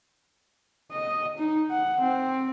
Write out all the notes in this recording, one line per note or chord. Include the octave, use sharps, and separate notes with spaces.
D#5
D#4
F#5
C4